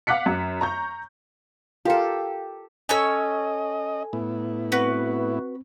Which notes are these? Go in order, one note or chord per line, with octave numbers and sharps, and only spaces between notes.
F5 F#5 D6 F#6 B6 C#7
F#2
A#5 C#6 G6
F4 G4 A4 A#4 F5 A5
C#4 A4 C#5 D#5 G#5 E6
A2 B3 E4
C4 F#4 B4